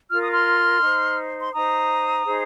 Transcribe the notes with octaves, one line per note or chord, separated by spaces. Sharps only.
F4 A#4 F6
D#6
C6 F6
D#4 C5
C6
D#4 C5 A#5 D#6
D#4 G#4 C5